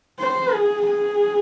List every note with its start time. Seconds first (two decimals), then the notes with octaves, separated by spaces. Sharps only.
0.20 C5
0.53 G#4
0.87 G#4